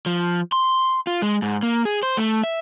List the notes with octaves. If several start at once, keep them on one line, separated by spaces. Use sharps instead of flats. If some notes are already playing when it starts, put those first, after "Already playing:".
F3
C6
F4
G#3
G#2
A#3
G#4
C5
A3
E5